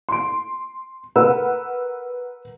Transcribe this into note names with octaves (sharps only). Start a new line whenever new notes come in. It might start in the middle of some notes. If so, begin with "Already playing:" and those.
C6 D7
A#4 B4 F#5 E6